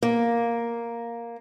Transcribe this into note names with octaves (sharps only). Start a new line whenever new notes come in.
A#3